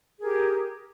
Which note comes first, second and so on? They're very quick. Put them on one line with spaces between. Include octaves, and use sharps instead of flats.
G#4 A#4 G4